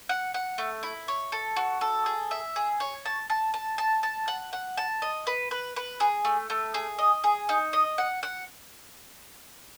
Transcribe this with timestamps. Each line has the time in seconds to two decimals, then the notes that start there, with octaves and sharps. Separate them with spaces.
0.09 F#5
0.34 F#5
0.58 A3
0.83 E4
1.08 C#5
1.32 A4
1.56 F#4
1.81 A4
2.06 G#4
2.31 E5
2.56 G#4
2.80 C#5
3.05 A5
3.30 A5
3.54 A5
3.78 A5
4.03 A5
4.28 F#5
4.53 F#5
4.77 A5
5.02 D#5
5.27 B4
5.51 B4
5.76 B4
6.00 G#4
6.25 A3
6.50 A3
6.74 G#4
6.99 D#5
7.24 G#4
7.49 D#4
7.73 D#5
7.98 F#5
8.23 F#5